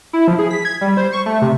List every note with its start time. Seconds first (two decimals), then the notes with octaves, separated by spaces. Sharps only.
0.13 E4
0.28 F3
0.39 G#4
0.51 B6
0.65 G#6
0.81 G3
0.97 C5
1.13 C#6
1.26 A3
1.42 C3